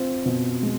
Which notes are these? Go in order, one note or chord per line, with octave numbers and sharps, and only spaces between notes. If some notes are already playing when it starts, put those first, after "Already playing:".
Already playing: C4 F4
B2
G#3